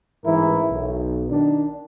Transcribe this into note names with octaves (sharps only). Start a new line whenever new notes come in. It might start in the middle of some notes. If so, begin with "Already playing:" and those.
A1 G#2 E3 E4 A#4
B1
D#3 D4